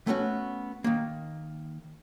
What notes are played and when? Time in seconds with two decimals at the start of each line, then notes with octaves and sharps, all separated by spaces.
0.07 A3 B3 C#4 F#4
0.84 D#3 A#3